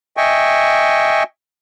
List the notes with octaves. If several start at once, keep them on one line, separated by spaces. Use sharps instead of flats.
D#5 E5 G5 G#5 C#6